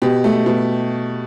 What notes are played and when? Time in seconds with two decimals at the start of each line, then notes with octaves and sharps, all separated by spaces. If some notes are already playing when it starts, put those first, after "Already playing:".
0.02 B2 G4
0.24 A3
0.46 B2